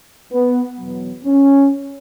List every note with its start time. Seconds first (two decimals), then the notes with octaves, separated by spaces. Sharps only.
0.32 B3
0.79 E2 B2 F#3
1.25 C#4